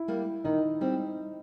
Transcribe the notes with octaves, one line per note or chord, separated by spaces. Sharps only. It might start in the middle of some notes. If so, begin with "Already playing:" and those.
Already playing: E4
G3 A#3
D#3 D#4
G3 C4